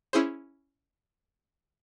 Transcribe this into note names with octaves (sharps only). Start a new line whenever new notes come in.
C#4 E4 G#4 C5